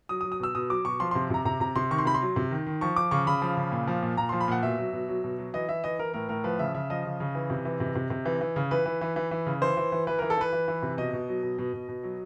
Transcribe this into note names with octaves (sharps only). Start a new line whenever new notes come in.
F#3 D#6
D#6
F#3
D#6
B2 E6
B2 D#6
F#3 D6
B2 C#6
F3 C6
C3 C6
C3 A#5
C3 A#5
C3 A#5
C3 C6
D#3 C#6
C6
C3 B5
C6
F#3
C3
D#3
D#3
F3 C#6
F3 D6
C#3 C#6
C#3 B5
F3
C#3
A#2
F3
A#2
A#2 A#5
F3 C6
B5
A#2 F#5
B2 E5
F#3
B2
F#3
B2
F#3
E3 D#5
E3 E5
E3 D#5
E3 A#4
A2 A#4
A2 A#4
F3 B4
C#3 E5
C#3 E5
F3 D#5
C#3
C#3
E3
C3
E3
C3
C3
C3
E3
E3
C#3
E3 B4
E3
E3
E3
E3
C#3
E3 C5
E3
E3
E3 B4
E3 A#4
A4
E3 B4
E3
E3
C3
B2 D#5
B2
F#3
B2
B2
B2
B2
F#3